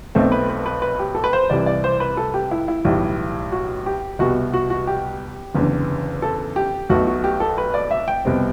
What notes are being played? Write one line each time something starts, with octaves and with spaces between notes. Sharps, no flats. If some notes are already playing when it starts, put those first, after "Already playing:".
B1 B2 A3 C4
B4
B4
B4
B4
G4
A4
B4
C5
C2 C3 E3 D5
D5
C5
B4
A4
G4
E4
E4
B1 A2 E3 G3
F#4
G4
C2 B2 G3 F#4
F#4
F#4
G4
F#1 E2 D3
A4
G4
B1 B2 A3 F#4
F#4
G4
A4
B4
D5
E5
G5
C2 B2 G3 C4